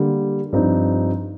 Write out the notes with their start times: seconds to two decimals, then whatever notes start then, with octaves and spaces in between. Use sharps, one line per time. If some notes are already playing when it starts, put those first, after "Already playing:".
Already playing: D3 G3 A#3
0.53 G2 F3 C4 D#4